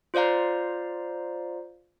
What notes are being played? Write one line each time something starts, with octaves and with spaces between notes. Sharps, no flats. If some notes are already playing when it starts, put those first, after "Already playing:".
F4 C5 D5 F5 A#5